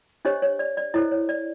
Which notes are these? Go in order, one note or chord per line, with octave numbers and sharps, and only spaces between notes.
D4 G4 C5 C#5 D#5
C#5
D5
D5
E4 A4 C5 C#5 D#5
C#5
D5